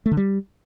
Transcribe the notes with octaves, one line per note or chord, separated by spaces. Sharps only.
A3
D3
G3